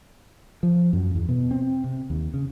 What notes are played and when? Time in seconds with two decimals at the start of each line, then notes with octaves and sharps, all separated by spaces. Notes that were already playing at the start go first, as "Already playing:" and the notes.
0.63 F3
0.93 F#2
1.15 E2
1.29 B2
1.51 C4
1.84 C3
2.10 D#2
2.34 C#3